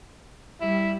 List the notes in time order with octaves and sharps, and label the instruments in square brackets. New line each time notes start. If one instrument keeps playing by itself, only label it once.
[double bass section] G3 [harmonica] E4